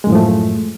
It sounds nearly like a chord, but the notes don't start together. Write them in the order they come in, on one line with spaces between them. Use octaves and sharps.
G#3 F#2 A2 F3 A3